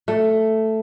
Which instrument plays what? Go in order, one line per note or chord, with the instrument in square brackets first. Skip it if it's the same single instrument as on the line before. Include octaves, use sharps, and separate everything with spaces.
[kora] A3